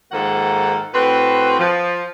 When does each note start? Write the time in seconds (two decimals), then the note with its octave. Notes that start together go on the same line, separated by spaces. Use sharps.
0.12 G#2 D#3 F3 A#3 A4 F#5
0.94 A2 C4 F#4 B4
1.59 F3